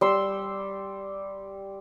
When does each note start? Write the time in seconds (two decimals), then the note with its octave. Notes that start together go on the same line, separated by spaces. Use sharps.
0.01 G3 C6 E6